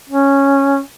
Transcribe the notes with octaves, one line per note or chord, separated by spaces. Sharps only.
C#4